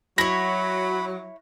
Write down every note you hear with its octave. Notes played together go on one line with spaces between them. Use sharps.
F#3 E4 C#5 B5 A#6